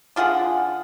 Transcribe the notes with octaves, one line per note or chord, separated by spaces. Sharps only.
D3 F4 G#4 F#5